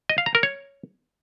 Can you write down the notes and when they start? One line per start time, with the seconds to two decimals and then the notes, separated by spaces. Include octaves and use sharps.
0.09 D#5
0.18 F5
0.26 A#5
0.35 A#4
0.43 C#5